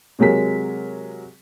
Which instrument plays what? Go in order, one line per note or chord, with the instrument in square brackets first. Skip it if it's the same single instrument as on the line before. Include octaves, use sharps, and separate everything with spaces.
[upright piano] C3 F#3 G#3 A#4 B6